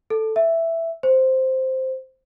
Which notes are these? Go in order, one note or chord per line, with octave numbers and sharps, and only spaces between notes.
A4
E5
C5